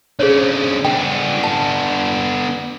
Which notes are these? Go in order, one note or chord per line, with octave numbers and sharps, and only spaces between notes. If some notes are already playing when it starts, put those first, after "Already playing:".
D3 C#4 G#4 C5 C#5
B3 D4 G5
A5